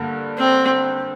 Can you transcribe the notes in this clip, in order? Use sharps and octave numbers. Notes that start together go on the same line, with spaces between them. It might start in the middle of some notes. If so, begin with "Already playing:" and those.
Already playing: G2 D3 A#3
C4